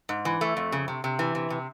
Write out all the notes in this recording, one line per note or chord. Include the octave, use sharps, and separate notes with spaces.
G#2
E3
A3
F2
C#3
C3
C3
E3
C3
C3